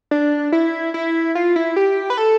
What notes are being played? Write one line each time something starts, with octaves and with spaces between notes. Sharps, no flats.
D4
E4
E4
F4
E4
G4
B4
A4